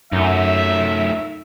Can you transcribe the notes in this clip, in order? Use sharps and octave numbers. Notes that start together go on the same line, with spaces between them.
F#2 A3 D#4 E5